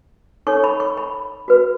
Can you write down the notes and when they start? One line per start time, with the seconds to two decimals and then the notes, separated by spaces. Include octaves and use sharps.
0.47 D#4 A4 C#5 C#6
0.64 B5
0.80 C#6
0.97 B5
1.48 F#4 B4